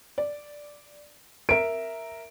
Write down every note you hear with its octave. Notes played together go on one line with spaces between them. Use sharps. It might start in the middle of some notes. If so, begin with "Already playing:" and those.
D5
A#4 E5 D7